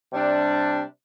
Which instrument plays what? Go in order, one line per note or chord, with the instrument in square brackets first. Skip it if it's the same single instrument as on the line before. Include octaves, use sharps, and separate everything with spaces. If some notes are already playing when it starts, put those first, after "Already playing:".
[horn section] C3 G3 D4